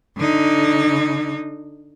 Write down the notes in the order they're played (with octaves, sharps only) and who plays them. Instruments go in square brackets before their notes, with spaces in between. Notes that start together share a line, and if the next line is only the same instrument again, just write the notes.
[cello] D3 D#4